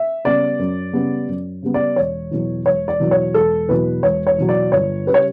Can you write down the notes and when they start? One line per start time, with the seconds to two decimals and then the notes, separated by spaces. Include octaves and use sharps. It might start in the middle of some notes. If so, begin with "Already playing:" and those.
Already playing: E5
0.24 C#3 G3 B3 D5
0.59 F#2
0.93 C#3 G3 B3
1.28 F#2
1.63 C#3 G3 B3
1.74 D5
1.96 E1 C#5
2.31 E2 B2 F#3
2.66 E1 C#5
2.88 D5
3.00 E2 B2 F#3
3.11 C#5
3.34 E1 A4
3.69 E2 B2 F#3 B4
4.03 E1 C#5
4.27 C#5
4.38 E2 B2 F#3
4.49 D5
4.72 G1 C#5
5.07 C#3 G3 B4
5.14 C#5